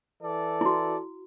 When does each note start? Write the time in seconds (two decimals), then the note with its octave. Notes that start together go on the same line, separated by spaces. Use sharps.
0.22 E3 A4 D5
0.61 E4 F#4